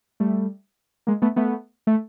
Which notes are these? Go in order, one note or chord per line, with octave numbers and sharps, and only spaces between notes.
G3 A3
G#3 A#3
A3 B3
A3 B3
A3